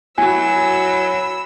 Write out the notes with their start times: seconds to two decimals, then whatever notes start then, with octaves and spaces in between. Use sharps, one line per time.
0.18 F#3 E4 F#4 G#5 B5 E6